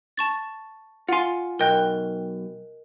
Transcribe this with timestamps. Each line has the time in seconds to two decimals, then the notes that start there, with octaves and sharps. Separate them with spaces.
0.17 A5 C#6 A6
1.09 F4 F#5 G#5 C6
1.59 B1 A#4 D#5 G5 F#6